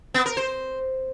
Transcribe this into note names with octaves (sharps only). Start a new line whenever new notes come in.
B3
A#4
C5